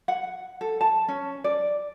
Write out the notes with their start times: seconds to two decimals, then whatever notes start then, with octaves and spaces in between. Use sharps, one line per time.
0.08 F#5
0.61 A4
0.81 A5
1.08 C#4
1.44 D5